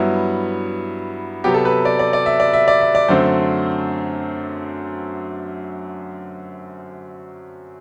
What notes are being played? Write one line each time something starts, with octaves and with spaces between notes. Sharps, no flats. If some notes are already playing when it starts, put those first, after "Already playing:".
Already playing: G2 F#3 B3 E4
C3 F#3 B3 G4
A4
B4
D5
D5
D5
E5
D5
E5
D5
E5
D5
F#2 D3 A3 C4 C5